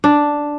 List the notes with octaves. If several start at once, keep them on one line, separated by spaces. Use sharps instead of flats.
D4